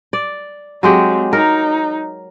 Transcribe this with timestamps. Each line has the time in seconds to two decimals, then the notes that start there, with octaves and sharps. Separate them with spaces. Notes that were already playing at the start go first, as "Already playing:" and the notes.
0.13 D5
0.83 F#3 G#3 C4 G4
1.33 D#4 A#4